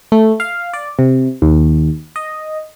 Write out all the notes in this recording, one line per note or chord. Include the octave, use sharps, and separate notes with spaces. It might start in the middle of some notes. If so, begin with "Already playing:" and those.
A3
F5
D5
C3
D#2
D#5